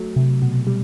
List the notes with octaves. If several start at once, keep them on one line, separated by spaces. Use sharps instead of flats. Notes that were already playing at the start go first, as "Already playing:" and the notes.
Already playing: F#3 A3
C3
B2
G3